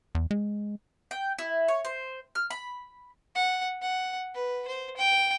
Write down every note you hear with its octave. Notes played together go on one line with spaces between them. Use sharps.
E2
G#3
G5
E4
C#5
C5
F6
B5
F#5
F#5
B4
C5
G5